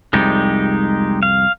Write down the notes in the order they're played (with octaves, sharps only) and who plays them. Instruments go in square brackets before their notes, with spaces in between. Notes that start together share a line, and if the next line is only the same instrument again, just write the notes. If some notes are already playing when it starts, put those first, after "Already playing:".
[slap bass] C2 F2 [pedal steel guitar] G#3 D#4 G4
[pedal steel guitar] F5